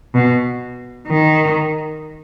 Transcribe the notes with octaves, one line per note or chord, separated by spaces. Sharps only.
B2
D#3